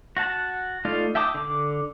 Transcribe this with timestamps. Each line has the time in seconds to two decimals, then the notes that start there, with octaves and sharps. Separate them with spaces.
0.17 F#4 F#5 A5
0.85 A3 D#4 F4 D5 F5
1.15 E5 G5 A5 D6 D#6
1.35 D3 D6